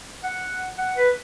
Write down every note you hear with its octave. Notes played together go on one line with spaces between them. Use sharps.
F#5
F#5
B4